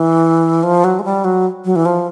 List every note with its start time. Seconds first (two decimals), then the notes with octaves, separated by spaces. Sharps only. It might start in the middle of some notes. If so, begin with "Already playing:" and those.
Already playing: E3
0.63 F3
0.84 F#3
0.99 G#3
1.04 G3
1.24 F#3
1.65 F#3
1.76 E3
1.85 F3